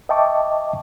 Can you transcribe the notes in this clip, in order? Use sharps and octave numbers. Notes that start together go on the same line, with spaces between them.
D#5 E5 G5 A5 C#6 D6